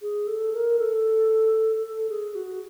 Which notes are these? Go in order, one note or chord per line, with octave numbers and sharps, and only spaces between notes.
G#4
A4
A#4
A4
A4
G#4
F#4